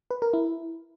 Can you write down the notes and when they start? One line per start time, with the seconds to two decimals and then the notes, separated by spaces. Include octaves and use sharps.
0.11 B4
0.22 A#4
0.33 E4